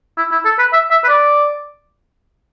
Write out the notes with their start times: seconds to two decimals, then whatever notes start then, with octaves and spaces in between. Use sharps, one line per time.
0.18 E4
0.31 E4
0.45 A4
0.59 B4
0.73 E5
0.91 E5
1.04 B4
1.09 D5